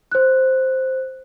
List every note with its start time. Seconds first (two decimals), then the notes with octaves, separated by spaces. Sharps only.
0.11 C5 F#6